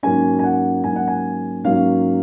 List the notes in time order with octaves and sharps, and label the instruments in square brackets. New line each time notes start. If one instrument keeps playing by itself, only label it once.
[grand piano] G#2 F#3 A#3 C#4 G#5
G#5
F#5
G#2 F#3 A#3 C#4 G#5
F#5
G#5
G#2 F#3 A#3 C#4 F5